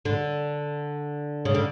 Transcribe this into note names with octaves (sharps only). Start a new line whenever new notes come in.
D3
C#3
D3